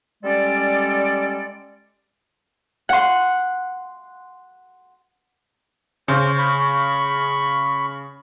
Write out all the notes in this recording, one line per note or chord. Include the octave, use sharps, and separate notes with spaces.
G3 G#3 C#4 A4 D5
F#5 C6
C#3 C5
B5 C#6